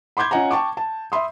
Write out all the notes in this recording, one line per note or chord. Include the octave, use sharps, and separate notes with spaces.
B5 C6 D6 G6 G#6
C#4 F4 D#5 F#5 G#5 A#5
G5 A5 C#6 D6
A5
E5 B5 C6 D#6